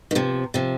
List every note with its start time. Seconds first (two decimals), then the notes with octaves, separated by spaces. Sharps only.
0.11 D#3
0.15 C3 F3
0.54 C3 F3